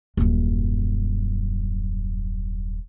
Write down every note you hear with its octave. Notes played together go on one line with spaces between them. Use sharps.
D#1 F#2